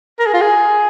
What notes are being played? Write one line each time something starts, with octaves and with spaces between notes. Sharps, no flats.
A#4
G#4
F4
G#4